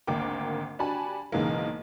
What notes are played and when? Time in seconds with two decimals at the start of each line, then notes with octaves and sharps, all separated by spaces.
0.07 G#1 D2 A#3 G5 D6
0.79 D4 F#4 G4 G#5 A5 B5
1.32 B1 G#2 C#3 E3 G#3 A#3